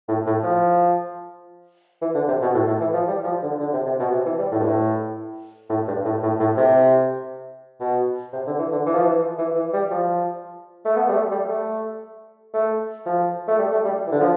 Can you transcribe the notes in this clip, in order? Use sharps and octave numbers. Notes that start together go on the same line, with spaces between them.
A2
A2
F3
E3
D3
C3
B2
A2
A2
E3
F3
G3
F3
D3
D3
C3
C3
B2
C3
E3
G3
A2
G2
A2
A2
G2
A2
A2
A2
C3
B2
C3
D3
E3
D3
E3
F3
E3
E3
E3
G3
F3
A3
B3
G3
A3
G3
A3
A3
F3
A3
G3
A3
G3
E3
D3
F3